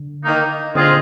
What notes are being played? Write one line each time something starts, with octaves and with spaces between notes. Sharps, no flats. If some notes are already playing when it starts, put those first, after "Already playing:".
Already playing: D3
D#3 A#3 D#4
A#2 D3 C4 F4 G#4 D#5